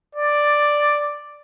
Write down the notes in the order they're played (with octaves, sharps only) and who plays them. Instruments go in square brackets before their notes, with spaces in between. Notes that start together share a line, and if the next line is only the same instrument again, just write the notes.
[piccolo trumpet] D5